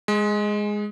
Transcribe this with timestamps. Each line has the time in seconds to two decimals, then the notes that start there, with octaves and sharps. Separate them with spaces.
0.08 G#3